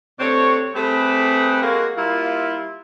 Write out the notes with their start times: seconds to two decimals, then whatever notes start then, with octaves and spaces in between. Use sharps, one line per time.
0.19 C3 A3 C4 D4 C#5
0.74 G3 A3 C4 G4 G#4 B4
1.62 G#3 A#3 F#4
1.97 G3 A#3 E4 F4